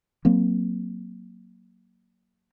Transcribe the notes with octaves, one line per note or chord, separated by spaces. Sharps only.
F#3 A#3 C4